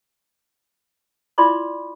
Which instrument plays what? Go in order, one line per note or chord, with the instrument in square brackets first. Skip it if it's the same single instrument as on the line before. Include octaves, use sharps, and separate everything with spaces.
[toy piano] E4 F4 D5 B5 C6 D6